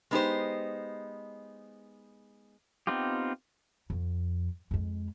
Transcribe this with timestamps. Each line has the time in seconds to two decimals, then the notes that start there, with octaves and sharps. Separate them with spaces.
0.11 G#3 B3 D#4 F#4 G4 C5
2.87 B3 C4 D#4 F4 G4
3.90 F2
4.71 F2 G#3